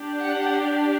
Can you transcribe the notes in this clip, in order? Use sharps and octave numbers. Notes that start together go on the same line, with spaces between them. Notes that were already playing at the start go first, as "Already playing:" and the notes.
Already playing: D4 G4
F#5